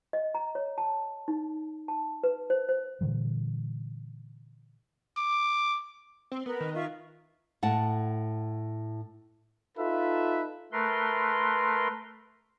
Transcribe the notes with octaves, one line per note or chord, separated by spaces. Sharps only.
D#5
A#5
C#5
A5
D#4
A5
B4
C5
C5
A#2 D3 E3 G3
D6
C4
B3 A#4 B4
D#3
F4 E5 C#6
A2 F#5 A5
D#4 F4 A4 B4 E5
A3 A#4 B4 C6